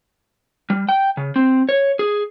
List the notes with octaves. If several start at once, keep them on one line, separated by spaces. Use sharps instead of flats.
G3
G5
C#3
C4
C#5
G#4